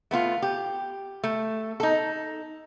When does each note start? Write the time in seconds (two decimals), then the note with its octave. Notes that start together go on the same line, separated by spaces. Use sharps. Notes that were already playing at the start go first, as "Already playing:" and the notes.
0.11 A3 B3 E4 F4
0.42 G4
1.24 A3
1.80 D#4 A4